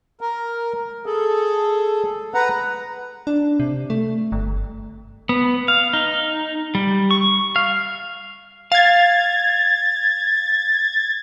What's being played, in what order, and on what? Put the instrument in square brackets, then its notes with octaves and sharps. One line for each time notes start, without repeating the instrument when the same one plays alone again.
[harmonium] A#4
G#4 A4
B4 F#5 A#5
[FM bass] D4
C3
A3
G1
[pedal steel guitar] B3
F5
D#4
G3
C#6
F5
[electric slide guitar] F5 [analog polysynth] G#6 A6